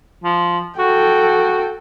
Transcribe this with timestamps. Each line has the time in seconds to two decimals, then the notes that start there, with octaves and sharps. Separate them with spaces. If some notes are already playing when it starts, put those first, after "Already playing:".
0.24 F3
0.79 F#4 A4 G5